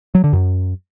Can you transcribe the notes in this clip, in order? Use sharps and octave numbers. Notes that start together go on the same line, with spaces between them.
F#3
D3
F#2